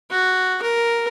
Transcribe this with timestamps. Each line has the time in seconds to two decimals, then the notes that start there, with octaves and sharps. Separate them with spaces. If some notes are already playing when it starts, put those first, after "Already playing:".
0.11 F#4
0.62 A#4